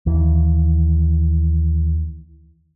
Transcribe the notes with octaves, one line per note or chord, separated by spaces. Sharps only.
D#2 E3